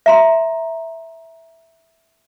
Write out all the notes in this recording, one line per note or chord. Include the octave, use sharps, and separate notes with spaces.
E5 A#5 C6